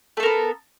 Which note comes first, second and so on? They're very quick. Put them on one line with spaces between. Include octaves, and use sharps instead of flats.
A3 A4 A#4 B3